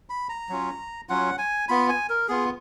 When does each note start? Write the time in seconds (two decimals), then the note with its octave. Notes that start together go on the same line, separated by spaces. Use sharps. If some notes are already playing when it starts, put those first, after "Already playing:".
0.10 B5
0.29 A#5
0.49 F#3 C#4 F4
1.09 F#3 C#4 F4 F#5
1.38 G#5
1.69 B3 F4 B5
1.89 G#5
2.09 A#4
2.28 B3 F4 G#4